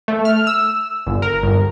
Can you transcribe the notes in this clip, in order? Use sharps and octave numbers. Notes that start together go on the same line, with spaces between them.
A3
F6
E6
G1
A#4
G1